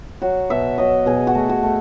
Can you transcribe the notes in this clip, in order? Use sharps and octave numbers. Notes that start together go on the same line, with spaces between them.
F#3 F#4
B2 E5
F#3 D#5
B2 G#4
F#4
A3
F#4
A3